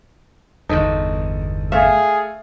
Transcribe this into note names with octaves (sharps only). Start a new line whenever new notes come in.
G1 E2 D#4 A4
A3 G#4 E5 F5